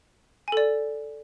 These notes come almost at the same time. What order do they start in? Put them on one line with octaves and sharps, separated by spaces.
G#5 A4 D5